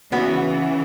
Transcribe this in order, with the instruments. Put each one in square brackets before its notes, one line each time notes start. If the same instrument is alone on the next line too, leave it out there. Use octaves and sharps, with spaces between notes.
[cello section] C#3 E3 [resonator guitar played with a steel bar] B3 F#4 B4